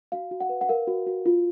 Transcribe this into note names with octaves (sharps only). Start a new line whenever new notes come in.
F#4 F5
F#4
F#5
B4
F#5
A#4 F5
F#4
F#4
F4